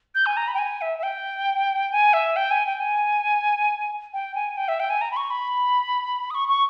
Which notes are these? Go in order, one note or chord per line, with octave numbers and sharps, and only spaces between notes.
G6
G#5
A#5
B5
G5
G#5
E5
E5
G5
G#5
E5
G5
G#5
G5
G#5
G5
G#5
G5
E5
G5
G#5
A#5
B5
C#6
B5
D#6
C#6
C#6